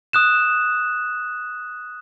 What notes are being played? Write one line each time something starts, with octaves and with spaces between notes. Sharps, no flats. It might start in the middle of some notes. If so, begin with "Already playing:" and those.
D#6 F#6 E7